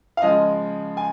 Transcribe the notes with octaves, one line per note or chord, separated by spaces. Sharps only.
F5
C#3 F3 G#3 D#5
G#5